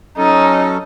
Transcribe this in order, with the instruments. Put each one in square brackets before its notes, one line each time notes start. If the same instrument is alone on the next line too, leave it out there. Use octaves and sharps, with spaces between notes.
[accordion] F#3 C#4 A4 [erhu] D#4